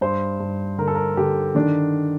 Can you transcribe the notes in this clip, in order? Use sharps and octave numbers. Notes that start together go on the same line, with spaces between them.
G2 C5
G2
D3 A#4
A4
A#4
D3 G4
D#3 D4